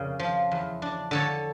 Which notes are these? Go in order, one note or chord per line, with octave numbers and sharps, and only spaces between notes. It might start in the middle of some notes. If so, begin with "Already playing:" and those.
Already playing: F2 C#3 C#4 A#4 D5
F3
E2
D4
D3 A4 C#5